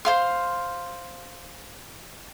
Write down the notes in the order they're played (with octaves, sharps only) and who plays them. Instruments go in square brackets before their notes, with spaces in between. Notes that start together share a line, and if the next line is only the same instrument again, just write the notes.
[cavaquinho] C5 F5 C6